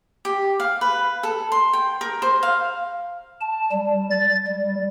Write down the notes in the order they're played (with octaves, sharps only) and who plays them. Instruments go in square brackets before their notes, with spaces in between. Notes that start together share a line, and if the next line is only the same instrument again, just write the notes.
[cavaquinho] G4
F5
B4
A4
C6
G5
A#4
C5
F5
[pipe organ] A5
G3
A6
G3